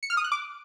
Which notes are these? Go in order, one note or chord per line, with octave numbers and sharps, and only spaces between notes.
C#7
F6
D#6
F#6
D6